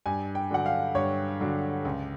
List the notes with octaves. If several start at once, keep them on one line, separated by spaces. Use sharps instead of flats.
G2 G#5
G5
D3 F#3 F#5
F5
G2 C#5
D3 F#3
C#2